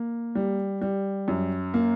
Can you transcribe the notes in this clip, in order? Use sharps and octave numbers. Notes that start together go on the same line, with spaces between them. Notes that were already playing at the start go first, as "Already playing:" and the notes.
Already playing: A#3
G3
G3
F#2
A#3